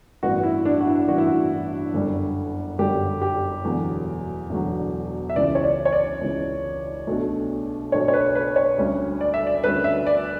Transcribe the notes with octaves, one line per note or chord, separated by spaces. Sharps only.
A1 G2 E3 B3 F#4
E4
D4
F#4
E4
A1 G2 E3 B3 F#4
E4
F#4
G1 F#2 D3 G3
G1 F#2 D3 G3 G4
G4
E1 E2 D3 F#3
E1 E2 D3 F#3
E5
C#2 C#3 E3 D5
C#5
D5
C#5
D5
C#2 C#3 E3
B1 B2 A3 D4
B1 B2 A3 D4 C#5
C#5
B4
B4
C#5
D2 D3 G3 C#4
D5
E5
D5
D2 D3 G3 C#4 B4
E5
D5